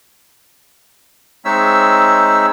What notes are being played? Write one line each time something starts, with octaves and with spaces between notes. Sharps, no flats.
G#3 C4 D#4 C#5 E5 E6